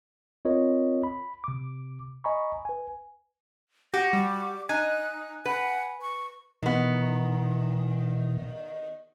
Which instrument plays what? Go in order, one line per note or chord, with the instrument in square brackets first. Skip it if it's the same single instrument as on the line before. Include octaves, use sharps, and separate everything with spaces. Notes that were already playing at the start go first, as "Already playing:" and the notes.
[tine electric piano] C4 F4 A#4 C#5 D#5
B5
C3 D6
D#5 G#5 A#5 B5 C#6
B4 G#5
[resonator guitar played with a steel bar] F#4 [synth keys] G4 [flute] A#6
[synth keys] G3 [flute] D6
[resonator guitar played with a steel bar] D#4 [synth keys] G#5 [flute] F#6
[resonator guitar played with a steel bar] B4 [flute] F#5
[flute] C#6
[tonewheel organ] B2 E3 [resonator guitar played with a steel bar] D#3 B3